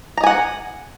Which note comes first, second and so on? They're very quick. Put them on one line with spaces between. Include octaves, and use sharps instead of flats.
A#5 D#5 G#5 F#5